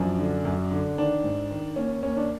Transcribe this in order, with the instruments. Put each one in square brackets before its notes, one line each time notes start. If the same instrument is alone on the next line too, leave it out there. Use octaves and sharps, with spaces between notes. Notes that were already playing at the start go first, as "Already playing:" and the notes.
Already playing: [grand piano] F#2 F3 D4
D3
F#2
D3
D#3 D4
G#2
D#3
D#2 C#4
D#2 C#4
D4